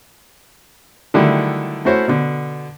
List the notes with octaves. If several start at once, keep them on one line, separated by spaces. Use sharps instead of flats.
D3 D#3 F#3 G3 A3 E4
A3 C#4 E4 F#4 C5 C#5
B2 D3